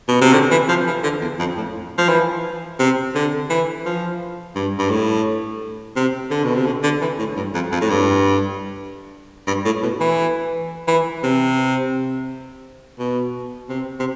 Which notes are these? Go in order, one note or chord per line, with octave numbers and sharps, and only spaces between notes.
B2
C3
D3
E3
F3
E3
D3
E2
F2
A2
F3
E3
C3
D3
E3
F3
G2
G2
A2
C3
D3
B2
C3
D3
D3
E3
A2
G2
F2
F2
A2
G2
G2
A2
B2
E3
E3
C3
B2
C3
C3